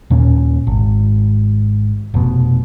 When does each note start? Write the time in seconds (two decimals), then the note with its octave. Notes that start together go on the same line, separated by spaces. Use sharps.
0.10 D#2 A#2 C#4
0.67 G#1
2.14 F1 B2